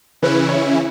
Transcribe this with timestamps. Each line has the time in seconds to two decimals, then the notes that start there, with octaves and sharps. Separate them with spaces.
0.22 C#3 E3 C#4 E4 B4
0.49 C#5